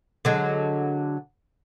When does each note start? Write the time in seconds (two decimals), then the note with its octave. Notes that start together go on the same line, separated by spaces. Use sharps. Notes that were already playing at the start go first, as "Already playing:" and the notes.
0.25 D3 F#3 G#3